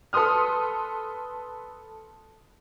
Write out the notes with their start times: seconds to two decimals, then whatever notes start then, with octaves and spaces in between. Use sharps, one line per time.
0.13 A4 B4 C6 D#6 F6